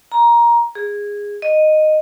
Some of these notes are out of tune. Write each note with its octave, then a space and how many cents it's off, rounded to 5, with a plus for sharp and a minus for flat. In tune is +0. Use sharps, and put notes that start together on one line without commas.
A#5 +15
G#4 -15
D#5 -10